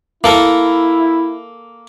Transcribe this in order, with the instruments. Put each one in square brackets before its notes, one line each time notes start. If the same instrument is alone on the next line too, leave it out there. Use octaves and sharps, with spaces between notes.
[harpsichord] A#3 A4 A#4 [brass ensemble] E4